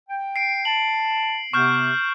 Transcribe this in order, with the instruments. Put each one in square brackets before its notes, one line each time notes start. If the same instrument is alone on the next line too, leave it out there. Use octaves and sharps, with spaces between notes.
[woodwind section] G5
[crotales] C7 D7
[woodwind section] A5 [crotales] F#7
[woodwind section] C3 B3 [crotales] C#6 F6 G6